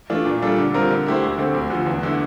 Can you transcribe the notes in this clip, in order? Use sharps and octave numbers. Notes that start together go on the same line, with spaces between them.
E3 A3 D4 F4
A#2
G3 D4 F4 A4
D3
G3 C4 F4 A#4
D3
A3 E4 G4 C5
D2
D3 A3 C4
D2
D3 F3
E2
D3 A3 E4